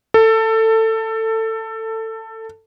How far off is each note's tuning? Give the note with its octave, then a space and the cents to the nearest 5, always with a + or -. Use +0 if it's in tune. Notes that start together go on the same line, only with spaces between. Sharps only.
A4 +20